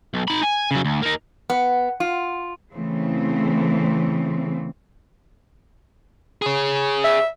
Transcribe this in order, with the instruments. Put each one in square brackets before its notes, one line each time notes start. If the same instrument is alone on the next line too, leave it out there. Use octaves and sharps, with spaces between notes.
[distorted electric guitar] B1
D#4 B5
G#5
C#3 F#3
D2
A#3 D#4
[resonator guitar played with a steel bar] B3
F4
[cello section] C#3 E3 A3 C4
[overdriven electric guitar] G#4 C#5
[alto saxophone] E5